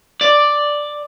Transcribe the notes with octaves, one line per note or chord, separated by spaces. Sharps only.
D5